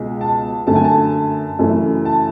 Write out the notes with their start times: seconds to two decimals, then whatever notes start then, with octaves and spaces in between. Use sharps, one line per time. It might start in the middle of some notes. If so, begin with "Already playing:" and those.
Already playing: C#2 B2 G#3
0.21 A5
0.67 F#2 D3 A3 A5
0.76 G#5
0.84 A5
1.59 F#2 C#3 E3 A3
2.05 A5